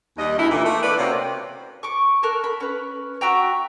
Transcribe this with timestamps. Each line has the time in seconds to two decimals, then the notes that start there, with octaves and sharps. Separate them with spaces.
0.18 D#2 G3 D#5
0.38 D2 D#4 E4
0.51 A#2 E3 A#3 A4
0.66 A3 A#3
0.83 B4 D5
0.99 C3 A#3 C4 C#4 F#4
1.83 C#6 D6
2.23 A4 A#4 F#6
2.44 B5
2.60 C#4 B4
3.21 F#4 E5 G5 A#5